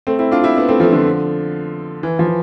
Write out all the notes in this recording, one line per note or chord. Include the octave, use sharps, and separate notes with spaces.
A3 C4
C4 E4
D4 F4
C4 E4
B3 D4
A3 C4
F3 A3
D3 F3
E3
F3
E3